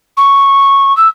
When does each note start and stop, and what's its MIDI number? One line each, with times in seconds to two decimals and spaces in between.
0.17 0.95 85
0.97 1.07 88